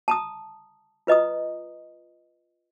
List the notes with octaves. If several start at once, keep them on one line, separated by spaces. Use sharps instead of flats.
A5 A#5 D#6
F4 B4 D#5 A#5 D#6